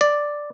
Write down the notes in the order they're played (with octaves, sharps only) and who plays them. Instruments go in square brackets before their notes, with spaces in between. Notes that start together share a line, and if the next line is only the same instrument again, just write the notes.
[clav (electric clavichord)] D5